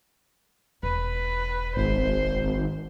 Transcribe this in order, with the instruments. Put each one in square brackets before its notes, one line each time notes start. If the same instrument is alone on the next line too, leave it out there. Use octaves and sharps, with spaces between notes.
[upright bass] E1 [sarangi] B4
[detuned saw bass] G#1 [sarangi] C5